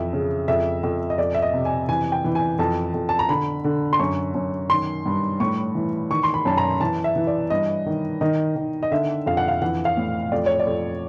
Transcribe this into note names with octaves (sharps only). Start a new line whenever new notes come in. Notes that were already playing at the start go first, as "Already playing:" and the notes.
Already playing: F2 E3 E5
C#3
F2 E5
F2
D#5
F2 D5
E5
D#5
C3
G#5
E3 G#5
G5
E3
G#5
F2 A5
F2
A5
A#5
D3 B5
D3
C6
F#2 C#6
F#2
D#3 C6
G2
A2 C#6
E3
D#3 C#6
C6
B5
F#2 A5
A#5
E3 A5
E5
E3
D5
G2 D#5
D#3
D#3 D#5
D#3
D#5
D3 E5
F2 F5
F#5
F5
E3 F#5
F5
A2
F2 D5
C#5
D5
F2